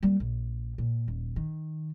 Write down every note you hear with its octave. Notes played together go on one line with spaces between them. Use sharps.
G3 A#3
A#1
A#2
D#1
D#3